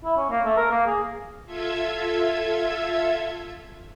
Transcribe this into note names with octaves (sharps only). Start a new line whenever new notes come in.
E4
C#4
A#3
A3
A#4
A#3
G#4
F4 A4 E5 G#6